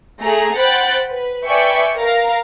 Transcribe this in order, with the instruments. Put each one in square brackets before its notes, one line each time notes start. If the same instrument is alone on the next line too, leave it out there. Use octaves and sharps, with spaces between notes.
[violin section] A3 G#4 A#5
C5 F#5 G5 B5 F#6 A6
B4
B4 D5 E5 G5 G#5 C#6
A#4 F5 A#5